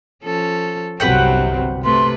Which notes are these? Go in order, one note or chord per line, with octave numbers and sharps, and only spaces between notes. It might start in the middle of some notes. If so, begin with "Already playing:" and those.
F3 C#4 A4
G1 C2 C3 F#3 C4 B4 F#5 G5
C3 A3 B4 C6